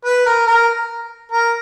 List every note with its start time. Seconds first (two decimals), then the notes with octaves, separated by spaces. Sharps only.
0.05 B4
0.26 A#4
0.47 A#4
1.32 A#4